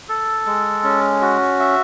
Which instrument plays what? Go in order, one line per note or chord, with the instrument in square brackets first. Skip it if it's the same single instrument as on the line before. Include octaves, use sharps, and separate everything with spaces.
[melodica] A4
G#3
C#4
F#4
E5